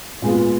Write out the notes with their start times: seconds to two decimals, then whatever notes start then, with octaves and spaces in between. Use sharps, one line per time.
0.22 A#2 G#3 B3 F4